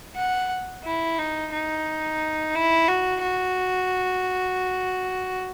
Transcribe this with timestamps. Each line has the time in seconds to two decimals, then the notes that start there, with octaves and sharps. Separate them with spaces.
0.16 F#5
0.85 E4
1.18 D#4
1.53 D#4
2.55 E4
2.88 F#4
3.23 F#4